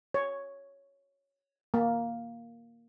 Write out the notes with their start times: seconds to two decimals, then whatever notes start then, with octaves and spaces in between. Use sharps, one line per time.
0.14 C#5
1.74 A#3